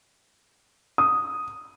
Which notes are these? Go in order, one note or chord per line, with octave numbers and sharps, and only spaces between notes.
D#6